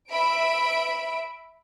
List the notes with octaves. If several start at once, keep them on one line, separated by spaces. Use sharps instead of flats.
E5 B5 D7